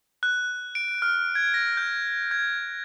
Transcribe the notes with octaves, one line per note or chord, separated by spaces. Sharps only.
F#6
D7
F6
G#6
A#6
G6
G#6